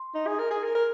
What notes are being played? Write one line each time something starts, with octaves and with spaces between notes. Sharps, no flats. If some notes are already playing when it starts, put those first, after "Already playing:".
Already playing: C6
D#4
G#4
A#4
G#4
A#4
A#4